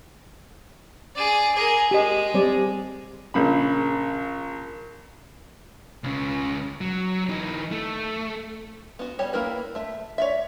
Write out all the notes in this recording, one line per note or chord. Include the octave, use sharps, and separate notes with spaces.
G#4 D5
G#4 A#4
G#3 G4 D#5
G3 C4 D5
A#1 C#3 B5
C#2 C#3
F#3
E3 D#4
A3
B3 F#4
G3 G4 C#5
A#3 E4 A#4 B4
A3 E5
C#5 D5 E5